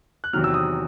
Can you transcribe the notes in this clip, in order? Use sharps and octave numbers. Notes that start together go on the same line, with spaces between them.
F#6
E2 C3 D#3 F#3 F6
E6
D#6